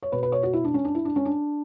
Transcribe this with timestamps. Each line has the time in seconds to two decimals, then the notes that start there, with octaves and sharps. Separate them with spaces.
0.02 C#5
0.12 B2 B4
0.23 B4
0.32 C#5
0.43 F#4
0.53 E4
0.64 D4
0.74 C#4
0.85 D4
0.95 E4
1.05 D4
1.16 C#4
1.25 D4